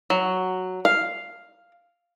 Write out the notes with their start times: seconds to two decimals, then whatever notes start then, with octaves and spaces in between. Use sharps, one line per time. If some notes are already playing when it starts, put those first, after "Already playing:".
0.10 F#3
0.85 F5